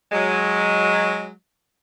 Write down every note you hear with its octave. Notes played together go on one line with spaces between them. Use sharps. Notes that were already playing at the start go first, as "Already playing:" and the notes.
F#3 G#3